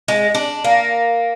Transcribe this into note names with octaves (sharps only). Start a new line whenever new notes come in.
G#3
D4
A#3